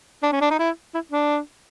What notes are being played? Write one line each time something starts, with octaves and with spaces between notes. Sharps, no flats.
D4
C#4
D4
D#4
E4
E4
D4